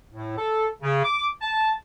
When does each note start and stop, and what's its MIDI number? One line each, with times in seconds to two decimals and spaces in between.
0.13 0.36 45
0.38 0.66 69
0.82 1.03 49
1.03 1.27 86
1.41 1.71 81